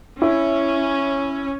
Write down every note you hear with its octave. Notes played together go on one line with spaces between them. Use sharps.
C#4 E4